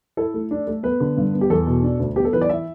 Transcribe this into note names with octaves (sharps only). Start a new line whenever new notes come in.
E4 A4
A3
D4
A3
B3 B4
D3
G2
B3
G4
E2 A4
B2
D4
D2
B3 G4
A4
E3 B4
D5
E4 E5